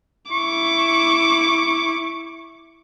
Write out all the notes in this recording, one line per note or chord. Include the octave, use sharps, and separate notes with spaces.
E4 C#6 D6